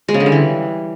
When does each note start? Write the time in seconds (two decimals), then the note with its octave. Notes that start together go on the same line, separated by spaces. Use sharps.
0.09 G#3
0.14 C#3
0.20 D3
0.26 G3
0.32 E3